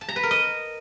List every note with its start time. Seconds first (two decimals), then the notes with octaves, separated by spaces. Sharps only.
0.01 A5
0.09 A#5
0.16 B4
0.23 A#4
0.31 D#5